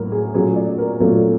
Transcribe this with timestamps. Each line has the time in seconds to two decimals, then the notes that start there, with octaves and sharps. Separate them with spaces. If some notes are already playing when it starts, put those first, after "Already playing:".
Already playing: A2 F#3 A#3 A#4
0.12 G#4
0.34 A#2 F#3 A3 C#4 G#4
0.56 D5
0.78 A#4
1.00 A#2 F#3 A3 C#4 A4